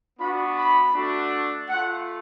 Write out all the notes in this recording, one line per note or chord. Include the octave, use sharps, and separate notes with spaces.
B3 D4 F#4 B5
B5
A3 D4 F#4
A3 F4 F#5